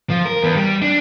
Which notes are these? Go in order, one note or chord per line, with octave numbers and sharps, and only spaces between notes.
F3
A#4
E2
G3
D4